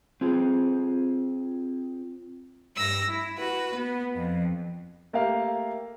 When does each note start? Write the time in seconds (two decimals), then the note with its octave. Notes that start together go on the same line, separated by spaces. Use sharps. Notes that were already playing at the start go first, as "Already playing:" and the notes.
0.21 C4 F4 G#4
2.77 G2 E6 A#6
3.09 E4
3.38 F#4 B4
3.75 B3
4.17 F2
5.13 A3 A#3 G4 A#4 F5 G5